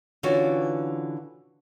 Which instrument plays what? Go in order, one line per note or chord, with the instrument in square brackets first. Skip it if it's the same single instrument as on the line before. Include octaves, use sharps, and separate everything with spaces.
[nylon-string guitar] D3 E3 C#4 F4 F#4